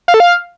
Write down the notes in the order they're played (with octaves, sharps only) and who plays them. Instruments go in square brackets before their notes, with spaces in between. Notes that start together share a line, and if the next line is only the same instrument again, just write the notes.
[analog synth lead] F5
A4
F5